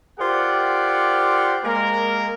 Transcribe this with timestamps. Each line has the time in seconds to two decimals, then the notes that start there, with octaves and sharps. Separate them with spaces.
0.19 F4 G4 A#4 C5 D5 F#5
1.64 G#3 A#3 A#4